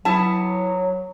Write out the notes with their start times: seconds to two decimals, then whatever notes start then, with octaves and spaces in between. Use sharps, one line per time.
0.05 F#3 B3 E4 A5